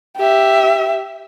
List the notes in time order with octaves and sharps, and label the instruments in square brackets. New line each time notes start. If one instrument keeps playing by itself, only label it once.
[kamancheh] G4 E5